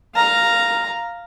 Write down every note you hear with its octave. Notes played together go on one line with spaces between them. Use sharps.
F5 A#5